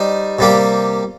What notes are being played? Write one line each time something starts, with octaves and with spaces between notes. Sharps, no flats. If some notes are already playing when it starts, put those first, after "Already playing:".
Already playing: G3 D#4 C5
C3 G3 A#3 G4